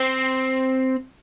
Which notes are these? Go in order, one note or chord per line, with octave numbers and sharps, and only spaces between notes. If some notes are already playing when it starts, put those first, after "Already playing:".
Already playing: C4